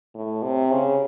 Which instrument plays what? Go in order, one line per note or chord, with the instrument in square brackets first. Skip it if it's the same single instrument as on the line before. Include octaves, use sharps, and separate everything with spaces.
[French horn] A2
C3
C#3